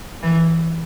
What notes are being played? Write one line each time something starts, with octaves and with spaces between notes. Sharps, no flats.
E3